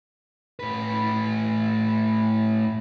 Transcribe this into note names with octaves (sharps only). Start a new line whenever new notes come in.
A2 B4